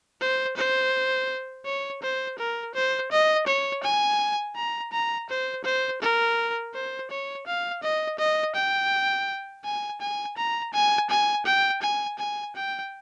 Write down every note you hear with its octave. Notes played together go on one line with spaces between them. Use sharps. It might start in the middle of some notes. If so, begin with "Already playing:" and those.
C5
C5
C#5
C5
A#4
C5
D#5
C#5
G#5
A#5
A#5
C5
C5
A#4
C5
C#5
F5
D#5
D#5
G5
G#5
G#5
A#5
G#5
G#5
G5
G#5
G#5
G5